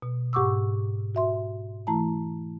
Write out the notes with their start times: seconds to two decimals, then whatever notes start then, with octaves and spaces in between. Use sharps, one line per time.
0.02 B2
0.33 G#2 G4 F#5 C#6 D6 E6
1.15 F#4 E5 C6
1.87 E3 A3 E4 A5 A#5